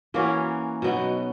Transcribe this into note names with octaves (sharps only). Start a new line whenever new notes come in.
E3 A#3 C#4 F#4
B2 F#3 B3 D#4